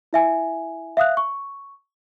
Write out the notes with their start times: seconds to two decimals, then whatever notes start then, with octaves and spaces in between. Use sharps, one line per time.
0.13 E4 E5 G#5
0.97 E5 F5 D#6 F#6
1.17 C#6